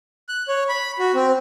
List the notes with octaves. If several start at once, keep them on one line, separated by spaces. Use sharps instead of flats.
F#6
C#5
B5
F#4
C4